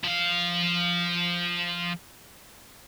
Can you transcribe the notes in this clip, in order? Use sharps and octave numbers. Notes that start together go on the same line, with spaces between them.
F3 F5